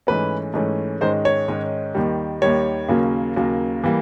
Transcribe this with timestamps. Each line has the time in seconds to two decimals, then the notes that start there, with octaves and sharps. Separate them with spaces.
0.07 G#2 E3 A3 C#4 B4
0.54 G#2 E3 A3 C#4
1.01 G#2 D#3 G#3 C#4 C5
1.25 C#5
1.48 G#2 D#3 G#3 C#4
1.95 D#2 D#3 G3
2.42 D#2 D#3 G3 C#5
2.88 D#2 C#3 F#3 A#3
3.36 D#2 C#3 F#3 A#3
3.84 E3 G3 A#3